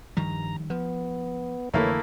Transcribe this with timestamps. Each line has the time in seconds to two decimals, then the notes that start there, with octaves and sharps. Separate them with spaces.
0.17 G2 D#3 F3 G3 A#5
0.70 F3 B3
1.74 F2 D3 E3 A3 A#3 E4 B4 C#5